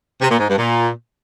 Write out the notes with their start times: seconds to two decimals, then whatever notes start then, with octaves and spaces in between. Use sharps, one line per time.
0.19 C3
0.28 A#2
0.37 G#2
0.47 G2
0.56 A#2